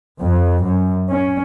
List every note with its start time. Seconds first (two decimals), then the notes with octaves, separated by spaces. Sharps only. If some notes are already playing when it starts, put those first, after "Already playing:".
0.21 F2
0.64 F#2
1.10 C#4